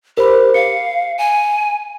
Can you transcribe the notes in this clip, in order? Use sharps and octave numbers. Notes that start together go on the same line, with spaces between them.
G4 A#4 C5 B5
F5 C#7
G#5